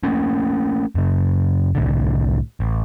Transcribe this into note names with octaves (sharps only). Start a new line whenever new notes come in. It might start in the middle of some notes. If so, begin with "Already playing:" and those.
A3 A#3 C#4
F#2 C#3
C2 A2 D3
A1